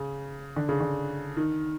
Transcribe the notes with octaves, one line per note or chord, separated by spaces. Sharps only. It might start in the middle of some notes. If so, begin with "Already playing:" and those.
Already playing: C#3
D3
C#3
D3
D#3